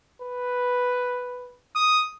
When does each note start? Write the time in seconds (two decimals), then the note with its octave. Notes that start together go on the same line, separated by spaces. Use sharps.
0.21 B4
1.76 D#6